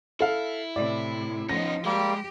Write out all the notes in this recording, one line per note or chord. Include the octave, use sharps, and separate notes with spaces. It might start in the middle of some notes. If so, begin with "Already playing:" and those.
E4 A4 F5
A2 C3 D5
F3 B3 C#4 D#4 A#6
G3 G#3 A#3 G4